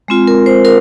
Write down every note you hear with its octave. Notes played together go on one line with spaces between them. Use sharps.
G#3 C4 F4
A#4
C5
A#4